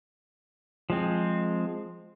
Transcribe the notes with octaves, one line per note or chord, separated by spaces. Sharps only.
F3 G#3 C4